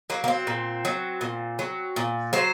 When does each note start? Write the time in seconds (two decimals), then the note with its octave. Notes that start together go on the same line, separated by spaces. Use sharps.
0.10 F#3 A#3
0.24 A#3
0.28 C4
0.47 A#2
0.85 F#3
1.21 A#2
1.59 F#3
1.96 A#2
2.33 F#3 C5